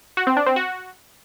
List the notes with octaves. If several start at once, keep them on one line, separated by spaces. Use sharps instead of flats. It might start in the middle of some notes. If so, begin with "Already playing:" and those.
F#4
C4
D4
C4
F#4